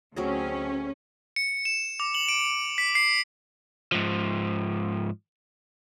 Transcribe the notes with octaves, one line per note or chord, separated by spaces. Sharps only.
D2 F#3 C4 C#4 G#4
C#7
E7
D6
F#7
D7
B6
C7
G#2 F3